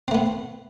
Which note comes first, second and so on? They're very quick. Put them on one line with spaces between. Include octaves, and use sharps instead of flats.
C4 A3 B3